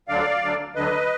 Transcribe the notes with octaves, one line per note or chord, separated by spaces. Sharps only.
D2 D3 F#3 D4 D5 F5
D2 D3 F#3 D4
D2 D3 F#3 D4 B4 D#5